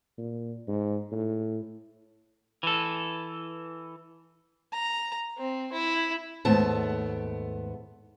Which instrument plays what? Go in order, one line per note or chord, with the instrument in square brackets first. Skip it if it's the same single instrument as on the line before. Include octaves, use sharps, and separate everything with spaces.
[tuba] A#2
G#2
A2
[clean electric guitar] E3 A4
[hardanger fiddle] A#5
C4
E4
[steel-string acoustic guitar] D#2 G#2 A3 B3 A5